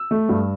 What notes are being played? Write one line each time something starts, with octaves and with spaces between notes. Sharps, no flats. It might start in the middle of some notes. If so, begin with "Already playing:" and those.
Already playing: E6
A3
G2